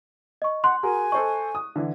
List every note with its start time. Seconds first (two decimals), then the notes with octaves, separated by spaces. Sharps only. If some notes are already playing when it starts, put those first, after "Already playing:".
0.42 D#5 C#6
0.64 F#5 C6 F#6
0.83 F#4 G#4 A#4 G#5
1.12 A4 C5 D#5 C#6
1.55 D#6
1.76 D3 E3